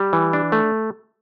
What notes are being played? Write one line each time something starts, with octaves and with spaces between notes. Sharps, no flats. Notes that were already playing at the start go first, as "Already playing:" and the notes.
Already playing: G3
E3
D4
A3